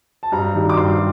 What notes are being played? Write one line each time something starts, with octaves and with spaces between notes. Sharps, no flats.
A5
G2 A#5
D#3 G3
D6
G2 C6